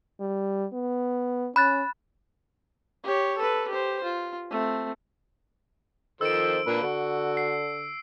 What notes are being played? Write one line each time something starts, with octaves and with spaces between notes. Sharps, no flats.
G3
B3
C#4 B5 F#6 A6
G4 C#5
A4 B4
G4 C5
F4
A3 C4
D#3 F3 A4 C5 E6 D7
A#2 A#3 D4 B4
D3 F#4
C7